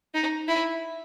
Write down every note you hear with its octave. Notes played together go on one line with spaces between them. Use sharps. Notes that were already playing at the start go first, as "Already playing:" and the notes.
D#4
E4